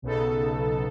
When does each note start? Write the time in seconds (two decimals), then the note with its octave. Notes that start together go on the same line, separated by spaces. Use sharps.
0.02 B1 C#3 B3 D#4 A4